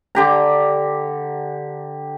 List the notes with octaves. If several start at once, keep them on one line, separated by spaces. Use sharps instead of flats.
D3 G4 A#5